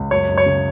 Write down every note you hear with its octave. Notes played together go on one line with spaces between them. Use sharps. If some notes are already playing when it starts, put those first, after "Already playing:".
Already playing: C#2
F#2 C#5
F#2
C#5
C#3